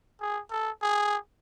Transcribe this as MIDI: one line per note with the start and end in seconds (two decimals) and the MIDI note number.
0.22 0.40 68
0.51 0.71 69
0.83 1.17 68